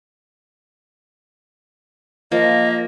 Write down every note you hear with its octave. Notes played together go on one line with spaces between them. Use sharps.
F3 A#3 D#5